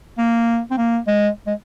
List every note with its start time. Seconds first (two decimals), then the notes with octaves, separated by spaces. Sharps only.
0.18 A#3
0.71 C4
0.78 A#3
1.08 G#3
1.47 G#3